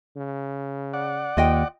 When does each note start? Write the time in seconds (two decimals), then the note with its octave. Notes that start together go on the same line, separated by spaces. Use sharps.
0.17 C#3
0.94 D5 F#5
1.37 D#2 F4 D#5 G5